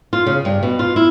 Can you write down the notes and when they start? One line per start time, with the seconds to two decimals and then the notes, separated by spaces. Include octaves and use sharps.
0.13 F4
0.26 C#3
0.45 G2
0.63 B2
0.79 F4
0.96 E4